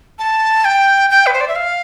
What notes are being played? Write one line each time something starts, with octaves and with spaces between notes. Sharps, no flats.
A5
G5
G5
B4
C5
D5
E5
F5